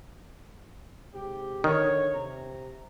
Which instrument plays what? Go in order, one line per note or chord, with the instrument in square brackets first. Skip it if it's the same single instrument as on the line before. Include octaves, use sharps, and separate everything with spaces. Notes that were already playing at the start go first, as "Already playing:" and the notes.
[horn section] G#2 C3 G4
[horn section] D3 C#5 [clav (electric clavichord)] D#3
[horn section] C3 A#5